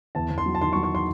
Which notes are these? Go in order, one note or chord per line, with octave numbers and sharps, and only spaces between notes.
E2 A5
E2
C6
F#3
A5
D#3 C6
C#6
F#3
C#6
C6